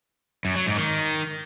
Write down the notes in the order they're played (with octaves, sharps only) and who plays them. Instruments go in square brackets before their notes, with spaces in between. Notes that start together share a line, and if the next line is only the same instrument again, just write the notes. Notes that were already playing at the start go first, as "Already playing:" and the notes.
[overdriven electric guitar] F#2
F#3
G#2
D#3